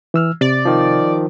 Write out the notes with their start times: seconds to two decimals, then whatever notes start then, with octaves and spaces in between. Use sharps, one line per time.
0.14 E3 E6 F6
0.41 C3 D5
0.65 D#3 F3